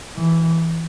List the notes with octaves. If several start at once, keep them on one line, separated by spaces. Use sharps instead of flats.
E3